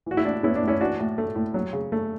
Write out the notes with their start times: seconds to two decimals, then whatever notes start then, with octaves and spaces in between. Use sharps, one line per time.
0.06 E3 F#4
0.17 E4
0.24 A2 D4
0.43 B3 C#4 E4
0.56 D4
0.62 A2
0.68 C#4 E4
0.81 E3 D4 F#4
1.00 A2
1.18 A3
1.35 A2
1.54 F#3
1.73 C#3
1.92 A3